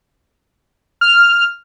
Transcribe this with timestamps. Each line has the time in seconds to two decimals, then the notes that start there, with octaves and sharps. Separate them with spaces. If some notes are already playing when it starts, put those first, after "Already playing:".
1.01 F6